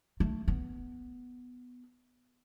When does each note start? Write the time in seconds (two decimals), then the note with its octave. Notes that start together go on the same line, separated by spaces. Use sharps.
0.20 A3
0.48 B3